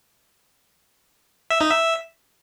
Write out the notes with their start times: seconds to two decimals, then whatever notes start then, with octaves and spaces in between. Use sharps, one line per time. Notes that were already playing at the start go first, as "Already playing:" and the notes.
1.50 E5
1.61 D#4
1.71 E5